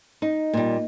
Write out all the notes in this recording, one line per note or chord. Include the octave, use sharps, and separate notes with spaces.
D#4
A#2 G3